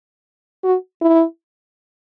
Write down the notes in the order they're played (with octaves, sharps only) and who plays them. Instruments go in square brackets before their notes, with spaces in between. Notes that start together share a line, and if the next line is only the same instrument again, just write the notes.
[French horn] F#4
E4